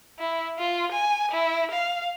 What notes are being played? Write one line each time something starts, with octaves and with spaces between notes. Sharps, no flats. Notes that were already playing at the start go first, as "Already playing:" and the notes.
E4
F4
G#5
E4
F5